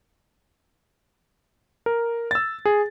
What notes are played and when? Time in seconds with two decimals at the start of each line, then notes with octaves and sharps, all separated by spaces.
1.86 A#4
2.31 E6 A6
2.65 G#4